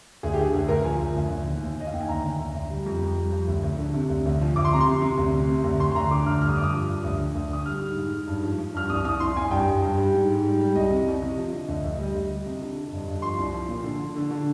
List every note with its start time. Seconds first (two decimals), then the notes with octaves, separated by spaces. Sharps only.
0.23 D2 G#4
0.33 G4
0.38 D3 G#4
0.54 D2 G#4
0.68 D2 A#4
0.85 F3 G#5
1.00 D2
1.16 D2
1.30 D2
1.46 D#2
1.63 D#2
1.77 D#2 D#5
1.87 F5
1.93 D#2 G5
2.01 G#5
2.09 D2 A#5
2.23 D2
2.39 D2
2.54 D2
2.70 G3
2.86 F2
3.02 F2
3.17 G3
3.32 F3
3.48 D2
3.63 D2
3.79 D3
3.94 C3
4.09 D2
4.26 D2
4.41 F3
4.56 D2 D6
4.65 C6
4.72 C3 A#5
4.81 C6
4.87 C3
5.02 C3
5.18 D2
5.33 C3
5.48 C3
5.64 D2
5.79 D2 C6
5.91 C6
5.95 D2 A#5
6.11 D3 D6
6.26 D2 F6
6.42 G2 F6
6.49 D#6
6.57 G2 D6
6.64 D#6
6.72 F3
6.88 G2
7.04 D2
7.19 D3
7.35 D2
7.51 D3 D#6
7.65 G3 F6
7.81 G#2
7.97 G#2
8.13 G#2
8.27 G2
8.43 F3
8.58 F3
8.74 G2 F6
8.90 C2 D#6
9.04 C2 D#6
9.20 C2 C6
9.36 C2 G#5
9.51 G2 G5
9.67 G2
9.82 G2
9.97 G3
10.14 G#2
10.29 G#2
10.45 G3
10.60 G3
10.75 C2 D#5
10.90 C3
11.07 C2
11.22 C3
11.37 F3
11.52 D3
11.68 D2
11.84 D2
11.99 G3 D#5
12.14 D2
12.29 G3
12.46 C3
12.61 D3
12.77 D3
12.92 G2
13.08 G2
13.22 F3 C6
13.38 C2
13.53 F3
13.69 A#2
13.84 D3
14.00 D3
14.16 D3
14.31 D3